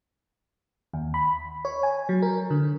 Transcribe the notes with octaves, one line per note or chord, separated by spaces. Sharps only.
D#2
B5
C#5
G#5
F#3
A#4
D3